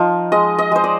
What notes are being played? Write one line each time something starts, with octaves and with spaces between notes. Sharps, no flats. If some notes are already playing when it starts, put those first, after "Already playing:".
Already playing: F3 D#4
G#3 D#5
D#5
G#3 C5
D5